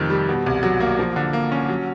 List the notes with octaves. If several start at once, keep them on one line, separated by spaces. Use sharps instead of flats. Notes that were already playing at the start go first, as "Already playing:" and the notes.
Already playing: F2 C3 D#3 A3
G3
B2
C2
F#3
A#3
F3
D3
A#3
C#4
F#3